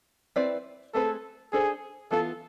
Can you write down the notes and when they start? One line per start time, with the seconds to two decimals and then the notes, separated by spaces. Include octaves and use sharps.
0.36 C4 E4 B4 D5
0.94 A3 C4 G#4 A4 B4
1.53 D4 G#4 A4 C5
2.11 E3 B3 F4 A4